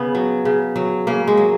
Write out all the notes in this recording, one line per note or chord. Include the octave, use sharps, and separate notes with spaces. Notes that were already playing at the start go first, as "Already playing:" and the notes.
Already playing: C#3 B3
F#3
C#3
F#3
C#3 A#3
G#3
F#3